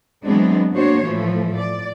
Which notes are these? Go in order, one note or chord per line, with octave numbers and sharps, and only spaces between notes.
E3 F#3 G#3 B3 C4 D4
A#3 D4 F#4 C5 C#5
A2 E3 F3 A3
D5